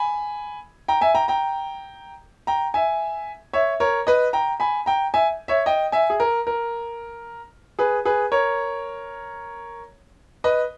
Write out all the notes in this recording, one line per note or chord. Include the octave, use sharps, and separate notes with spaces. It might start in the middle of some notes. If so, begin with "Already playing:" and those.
Already playing: G#5 B5
G5 A#5
E5 G#5
G5 A#5
G5 A#5
G5 A#5
E5 G#5
C#5 E5
A#4 C#5
B4 D#5
G5 A#5
G#5 B5
G5 A#5
E5 G#5
C#5 E5
D#5 G5
E5 G#5
G#4
A#4
A#4
G#4 B4
G#4 B4
A#4 C#5
B4 D#5